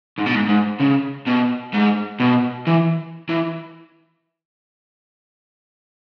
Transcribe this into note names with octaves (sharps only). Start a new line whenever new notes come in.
G#2
B2
G#2
G#2
C#3
B2
G#2
B2
E3
E3